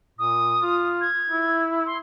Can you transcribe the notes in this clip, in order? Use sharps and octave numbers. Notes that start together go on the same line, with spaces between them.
A#2 D#6
F4
G#6
E4
C6